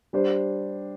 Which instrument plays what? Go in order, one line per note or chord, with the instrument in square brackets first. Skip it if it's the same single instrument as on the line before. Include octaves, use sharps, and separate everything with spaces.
[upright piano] G3 D4 G4 C5